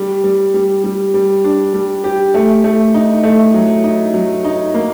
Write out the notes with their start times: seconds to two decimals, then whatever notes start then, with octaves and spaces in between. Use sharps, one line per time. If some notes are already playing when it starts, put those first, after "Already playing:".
Already playing: G3
0.24 G3
0.54 G3
0.84 G3
1.14 G3
1.44 D4
1.74 G3
2.04 G4
2.34 A3
2.64 A3
2.94 D#4
3.23 A3
3.54 F#3
3.84 D#4
4.14 F#3
4.44 D#4
4.74 A#3